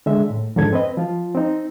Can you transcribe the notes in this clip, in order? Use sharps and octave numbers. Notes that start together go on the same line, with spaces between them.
D3 G#3 E5
A2
F2 G#2 D3 A4 G#6
C4 B4 D#5
F3 F4
C4 D#4